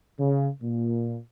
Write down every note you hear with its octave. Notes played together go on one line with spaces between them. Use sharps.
C#3
A#2